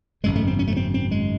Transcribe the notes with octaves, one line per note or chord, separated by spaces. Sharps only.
G#1 F#2 C#3 G#3
A3
C4
C#4
A3
C4
C4
G#3